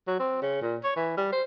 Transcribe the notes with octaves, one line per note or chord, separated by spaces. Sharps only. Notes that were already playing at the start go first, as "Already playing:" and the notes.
F#3
C4
C#3
A#2
C#5
E3
G3
C5